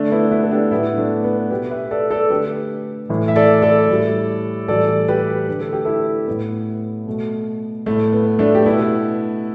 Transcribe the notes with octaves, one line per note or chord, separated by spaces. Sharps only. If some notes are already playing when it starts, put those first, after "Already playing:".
Already playing: D3 A3 D4
B3 E4
B3 E4
A4
D4 G4
A2 A3 B3 E4
A3 D4
B3
B2 A3 G4 B4
B4 E5
A4 D5
A4 D5
D3 A3 G4 B4
A2 E3 A3
E5
A4 D5
A4 D5
A2 G3
A2 E3 G3 A4 D5
G4 B4
D3 A3 B4
A4
G4
E4 A4
A2 A3 B3
B2 A3
A2 A3
B3
A3 D4
G4
B2 A3 B3 E4